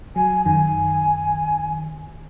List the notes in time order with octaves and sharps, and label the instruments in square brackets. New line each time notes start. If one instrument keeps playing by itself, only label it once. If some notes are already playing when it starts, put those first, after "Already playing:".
[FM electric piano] F#3 [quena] G#5
[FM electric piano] F#2 D#3 [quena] G#5